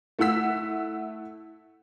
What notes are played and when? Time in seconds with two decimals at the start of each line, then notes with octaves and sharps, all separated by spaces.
0.19 A3 E4 F#5 E6 B6